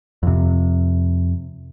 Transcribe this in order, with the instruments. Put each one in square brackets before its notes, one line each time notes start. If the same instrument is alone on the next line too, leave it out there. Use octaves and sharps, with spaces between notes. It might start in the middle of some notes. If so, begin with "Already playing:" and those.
[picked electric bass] F2 C3